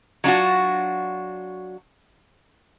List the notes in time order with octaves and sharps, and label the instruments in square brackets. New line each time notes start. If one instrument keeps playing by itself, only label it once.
[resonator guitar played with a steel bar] F#3 D4 F4 F#4